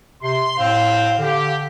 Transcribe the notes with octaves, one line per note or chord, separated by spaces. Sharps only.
C3 C6
A2 C4 C5 F5
D3 G4